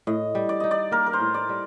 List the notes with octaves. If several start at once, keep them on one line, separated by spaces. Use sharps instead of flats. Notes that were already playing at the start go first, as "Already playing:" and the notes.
A2 D#5
G3
D5
D#4 D#5
D5
A#3 A#4
A#4
C5
A2
D5
G3